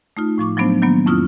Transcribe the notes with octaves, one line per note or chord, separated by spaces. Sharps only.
A3 D#4 F4
A2 F3 C#6 D6
F3 F#3 A3 B3 D4 C5
D#3 F#3 A#3 B3
F2 C#4 E4 F4 D#6 F6